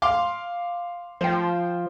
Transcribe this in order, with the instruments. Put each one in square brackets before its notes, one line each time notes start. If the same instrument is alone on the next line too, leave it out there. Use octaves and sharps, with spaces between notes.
[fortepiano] F5 C6 D6
[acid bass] F3 [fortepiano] C5 G5